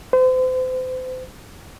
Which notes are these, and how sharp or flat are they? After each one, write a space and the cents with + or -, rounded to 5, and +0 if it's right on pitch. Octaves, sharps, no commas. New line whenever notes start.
C5 -35